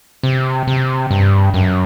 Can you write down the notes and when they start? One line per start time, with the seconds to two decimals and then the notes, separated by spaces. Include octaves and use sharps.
0.23 C3
0.67 C3
1.11 G2
1.54 F#2